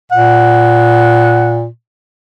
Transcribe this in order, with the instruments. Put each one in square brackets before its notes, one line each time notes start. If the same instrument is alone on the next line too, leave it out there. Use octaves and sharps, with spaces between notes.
[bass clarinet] A#2 [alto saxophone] F#5